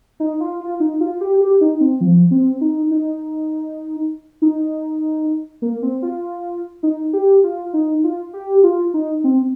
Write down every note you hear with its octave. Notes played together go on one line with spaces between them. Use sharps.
D#4
F4
F4
D#4
F4
G4
G4
D#4
C4
F3
C4
D#4
D#4
D#4
A#3
C4
F4
D#4
G4
F4
D#4
F4
G4
F4
D#4
C4